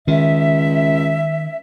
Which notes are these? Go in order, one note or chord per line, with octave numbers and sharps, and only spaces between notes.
C#2 D#3 E5